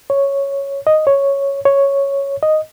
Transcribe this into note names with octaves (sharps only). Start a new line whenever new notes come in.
C#5
D#5
C#5
C#5
D#5